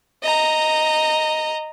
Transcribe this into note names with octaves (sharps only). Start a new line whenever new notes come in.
D#5 A#5